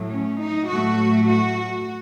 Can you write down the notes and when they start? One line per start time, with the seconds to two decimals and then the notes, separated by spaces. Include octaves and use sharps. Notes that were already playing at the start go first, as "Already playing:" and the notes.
Already playing: A2 F#3 A3
0.10 C#4
0.39 D#4
0.68 A2 F#3 A3 F#4
1.26 F#4